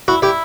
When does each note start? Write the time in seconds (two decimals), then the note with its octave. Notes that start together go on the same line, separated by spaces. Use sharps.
0.08 E4 F#4
0.22 E4 G4